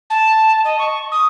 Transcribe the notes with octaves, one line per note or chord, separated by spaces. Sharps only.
A5
D#5
C#6
D#6